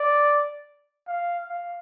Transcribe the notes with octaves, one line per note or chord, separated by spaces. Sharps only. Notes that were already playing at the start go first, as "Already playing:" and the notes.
Already playing: D5
F5
F5